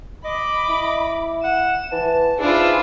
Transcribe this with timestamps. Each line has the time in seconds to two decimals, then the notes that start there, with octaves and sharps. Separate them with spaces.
0.25 D#5 B5 D6
0.69 E4
1.44 F#5 E7
1.92 E3 A5
2.38 G#2 D4 E4 F4 G#4 B4